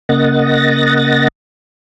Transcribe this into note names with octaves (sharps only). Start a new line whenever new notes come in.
C#3 A#3 D#5 F#5 A6 A#6